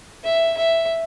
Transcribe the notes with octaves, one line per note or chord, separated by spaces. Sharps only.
E5
E5